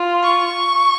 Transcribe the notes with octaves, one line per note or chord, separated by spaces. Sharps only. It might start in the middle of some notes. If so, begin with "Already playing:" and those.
Already playing: F4
C#6